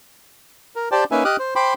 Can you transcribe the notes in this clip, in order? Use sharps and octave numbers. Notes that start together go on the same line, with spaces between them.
A#4
G4 C5 D5 G5 A5
A#3 C#4 D#4 B4 E5 G#5
G4 D#5 D6 D#6 F6 F#6
C5
C5 G5 B5 C6 D6